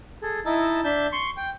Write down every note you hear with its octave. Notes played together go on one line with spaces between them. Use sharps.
G#4 A4
D#4 E4 D#5 A5 E6
D4 E5 A5 G6
C6 C#6
G5